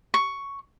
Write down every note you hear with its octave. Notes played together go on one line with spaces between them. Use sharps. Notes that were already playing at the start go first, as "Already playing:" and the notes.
C#6